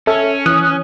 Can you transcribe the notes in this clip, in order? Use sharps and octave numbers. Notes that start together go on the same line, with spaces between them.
C#4 A4 E5
E3 D#6 F#6